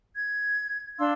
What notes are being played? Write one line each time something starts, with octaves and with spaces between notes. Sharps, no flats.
G#6
D4 F5 C6 E6